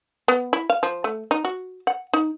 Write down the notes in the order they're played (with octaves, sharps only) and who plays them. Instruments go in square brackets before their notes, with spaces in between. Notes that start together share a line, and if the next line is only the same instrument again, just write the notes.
[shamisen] B3
E4
F5
F3
A3
D#4
F#4
F#5
D#4